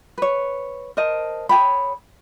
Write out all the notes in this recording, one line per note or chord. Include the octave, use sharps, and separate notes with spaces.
B4 C#5
A#4 C5 D#5 A5
G#4 C#5 G5 B5